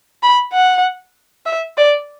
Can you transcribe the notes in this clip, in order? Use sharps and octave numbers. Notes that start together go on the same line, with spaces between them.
B5
F#5
E5
D5